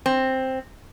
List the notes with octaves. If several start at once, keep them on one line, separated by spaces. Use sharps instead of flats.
C4